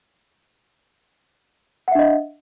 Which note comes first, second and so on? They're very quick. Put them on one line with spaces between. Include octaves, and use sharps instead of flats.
F#5 E5 D4 D#5